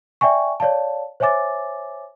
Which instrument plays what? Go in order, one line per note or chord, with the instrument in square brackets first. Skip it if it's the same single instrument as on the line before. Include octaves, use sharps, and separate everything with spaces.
[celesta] D5 E5 G5 G#5 C#6
C#5 D5 F5 A5
C5 C#5 E5 G#5 D6 A6